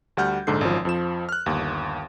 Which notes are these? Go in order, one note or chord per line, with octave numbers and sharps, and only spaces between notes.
D2 G3 F#5 F6 G6
A#1 G#2 D3 A4 C7
G#1 F#2 F3
F2 F3 E7
F6 F#6
G1 D#2